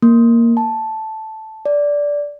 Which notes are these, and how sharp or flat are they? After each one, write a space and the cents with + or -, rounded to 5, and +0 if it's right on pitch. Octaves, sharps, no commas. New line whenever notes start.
A#3 -5
A5 -5
D5 -10